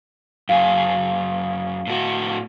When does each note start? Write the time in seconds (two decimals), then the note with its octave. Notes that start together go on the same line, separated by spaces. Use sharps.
0.49 F#2 G#4 F5
1.87 A2 F#4